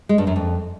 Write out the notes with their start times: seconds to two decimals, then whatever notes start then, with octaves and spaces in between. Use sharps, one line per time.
0.09 G#3
0.18 G2
0.27 F#2
0.36 F2